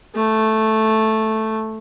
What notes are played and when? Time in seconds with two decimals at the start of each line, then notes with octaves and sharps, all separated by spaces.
0.15 A3